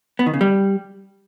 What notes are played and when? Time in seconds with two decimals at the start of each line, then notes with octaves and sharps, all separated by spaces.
0.19 B3
0.26 D#3
0.34 C#3
0.41 G3